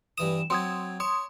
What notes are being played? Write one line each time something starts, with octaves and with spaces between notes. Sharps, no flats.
G2 E3 D#6 E7
F#3 C4 C6 D#6 G#6
C#5 C6 D#6